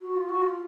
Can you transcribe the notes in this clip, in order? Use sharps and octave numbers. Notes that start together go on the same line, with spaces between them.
F#4
F4
F#4
F4